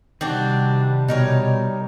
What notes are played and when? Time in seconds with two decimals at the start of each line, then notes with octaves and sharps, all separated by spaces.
0.21 C3 D#3 G3 C4 D4 F#4
1.08 B2 D#4 A#4 C#5